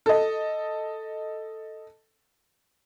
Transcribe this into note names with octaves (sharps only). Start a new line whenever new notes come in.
A4 D#5